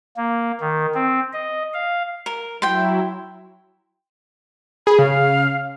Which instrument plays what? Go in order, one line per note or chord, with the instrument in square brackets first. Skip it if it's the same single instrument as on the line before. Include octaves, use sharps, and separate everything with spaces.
[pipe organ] A#3
D#3
C4
D#5
F5
[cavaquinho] A#4
[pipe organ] F#3 E4 [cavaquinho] G5 C6
[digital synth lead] G#4 [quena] B5
[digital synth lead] C#3 [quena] F5